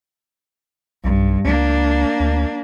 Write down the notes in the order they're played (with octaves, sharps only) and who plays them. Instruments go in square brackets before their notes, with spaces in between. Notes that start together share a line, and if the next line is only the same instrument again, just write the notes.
[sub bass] B1 [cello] G2
[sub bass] C#2 [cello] A#3 D4
[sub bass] D2